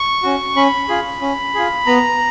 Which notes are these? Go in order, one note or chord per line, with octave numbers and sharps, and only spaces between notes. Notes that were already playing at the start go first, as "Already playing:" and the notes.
Already playing: C#6
C#4 F#4
C#4 B5
F4 G#4
C#4
F4 G#4
B3 A#5